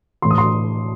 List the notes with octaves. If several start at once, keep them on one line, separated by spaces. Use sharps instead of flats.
A2 E3 C6
D#6
C6